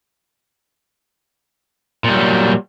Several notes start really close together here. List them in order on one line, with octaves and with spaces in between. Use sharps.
A#2 G3 F#3